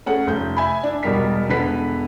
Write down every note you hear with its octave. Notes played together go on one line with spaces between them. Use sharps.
A3 C#4 G#4 F#5
F1 G6
E5 G#5 B5
D4
E1 B2 G3 A#4 B6
E1 D3 B3 B4 B6